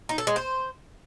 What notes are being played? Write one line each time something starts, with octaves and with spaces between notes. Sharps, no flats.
D#4
A4
G#3
C5